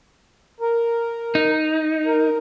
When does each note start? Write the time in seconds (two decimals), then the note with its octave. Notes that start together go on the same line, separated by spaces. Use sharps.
0.60 A#4
1.35 D#4
2.06 A#4